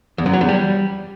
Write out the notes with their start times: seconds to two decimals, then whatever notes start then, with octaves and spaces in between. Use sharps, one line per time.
0.18 E2
0.26 F#2
0.33 F#3
0.41 E2
0.49 G3